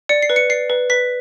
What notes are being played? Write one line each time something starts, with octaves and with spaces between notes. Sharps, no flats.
D5 C#7
C7
B4
C#7
D5 C7
B4
B4 B6